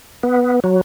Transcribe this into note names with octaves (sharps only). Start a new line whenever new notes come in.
B3
F#3